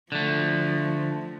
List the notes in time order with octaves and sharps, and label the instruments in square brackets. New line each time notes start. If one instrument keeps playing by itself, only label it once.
[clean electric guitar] D3 A3 [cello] F3